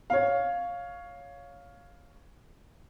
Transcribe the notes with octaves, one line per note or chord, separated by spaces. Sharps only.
C#5 F5